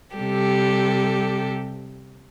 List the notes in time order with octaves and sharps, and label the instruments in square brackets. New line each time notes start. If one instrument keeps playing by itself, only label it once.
[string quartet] C3 G3 G4 A4